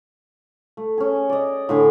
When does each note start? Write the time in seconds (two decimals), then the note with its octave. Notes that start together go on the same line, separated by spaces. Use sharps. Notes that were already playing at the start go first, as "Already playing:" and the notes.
0.77 A3
0.98 C#4 G#4
1.29 D5 D#5
1.69 A2 D3 G#5